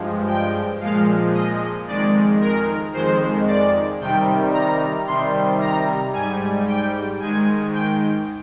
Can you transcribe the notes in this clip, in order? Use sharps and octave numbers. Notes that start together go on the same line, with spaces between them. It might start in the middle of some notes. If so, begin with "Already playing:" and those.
Already playing: G2 F3 G#3
G5
A#2 F3 G#3 F5
D#5
F2 D#3 G#3 D5
A#4
F2 D#3 G#3 C5
D5
C3 D#3 G3 G5
A#5
C3 D#3 G3 C6
A#5
G#2 G3 G#5
G5
G#2 D#3 G#3 G#5
G5